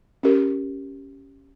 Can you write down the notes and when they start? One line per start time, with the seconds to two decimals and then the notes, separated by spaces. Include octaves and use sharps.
0.23 C#4 G4 A#4